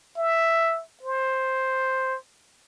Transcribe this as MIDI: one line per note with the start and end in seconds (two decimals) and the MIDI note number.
0.17 0.82 76
1.03 2.17 72